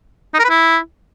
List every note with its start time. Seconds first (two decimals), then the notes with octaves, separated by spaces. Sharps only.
0.34 D#4
0.39 A#4
0.44 B4
0.49 E4